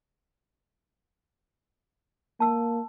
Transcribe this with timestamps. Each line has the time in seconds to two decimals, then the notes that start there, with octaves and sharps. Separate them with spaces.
2.40 A#3 A5 E6